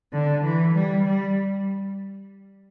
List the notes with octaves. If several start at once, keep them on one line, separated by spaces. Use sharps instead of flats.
D3
E3
G3
G3